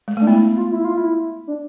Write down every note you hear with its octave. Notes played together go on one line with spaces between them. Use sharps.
G#3
A3 D4
B3 E4
F4
E4
F4
E4
D4